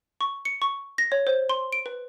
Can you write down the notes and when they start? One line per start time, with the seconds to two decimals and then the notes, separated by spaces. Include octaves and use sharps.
0.21 C#6
0.45 C#7
0.62 C#6
0.98 A#6
1.12 C#5
1.27 C5
1.50 C6
1.73 D7
1.86 B4